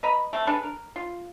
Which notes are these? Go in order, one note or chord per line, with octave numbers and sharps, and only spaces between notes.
B4 D#5 A#5 B5
A3 C4
D4 G#4 A4 B4
A#4
F4